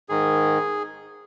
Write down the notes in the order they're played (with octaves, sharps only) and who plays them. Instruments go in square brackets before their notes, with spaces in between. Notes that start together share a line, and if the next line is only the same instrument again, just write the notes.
[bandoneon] G#2 D#3 G#4